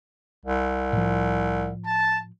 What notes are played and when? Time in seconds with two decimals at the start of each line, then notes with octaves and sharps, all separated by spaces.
0.45 C2
0.93 A2 F3
1.85 A5